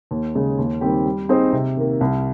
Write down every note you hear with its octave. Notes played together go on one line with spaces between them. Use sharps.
D#2
C#3 G#3
D#2
D#3 G3 C4 G4
G3
C4 D#4 G#4 C5
C3
D#3 A#3
C2